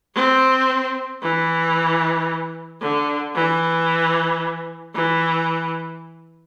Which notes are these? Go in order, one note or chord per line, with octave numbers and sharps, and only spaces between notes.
C4
E3
D3
E3
E3